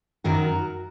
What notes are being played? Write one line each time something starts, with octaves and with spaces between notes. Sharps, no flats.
F#2 D#3 F#3 F#4 A#4